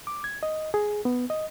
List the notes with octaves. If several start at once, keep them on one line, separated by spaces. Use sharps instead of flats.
D6
G#6
D#5
G#4
B3
D#5